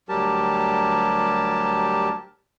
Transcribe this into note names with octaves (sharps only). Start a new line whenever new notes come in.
D2 F#3 G3 G4 A#4 A5